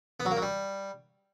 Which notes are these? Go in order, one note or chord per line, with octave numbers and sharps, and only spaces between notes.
B3
F#3
A#3
F#3
G3